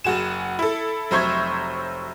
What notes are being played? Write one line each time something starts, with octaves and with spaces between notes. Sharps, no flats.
F#1 F#4 G#4 E7
E4 A4
F1 F#3 C5 E5 C#6 G#6